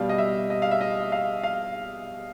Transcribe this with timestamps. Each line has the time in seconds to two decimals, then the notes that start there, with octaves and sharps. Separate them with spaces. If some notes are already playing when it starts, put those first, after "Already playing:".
Already playing: B2 G3 F5
0.09 D#5
0.18 E5
0.50 D#5
0.62 F5
0.71 E5
0.81 D#5
1.12 F5
1.43 F5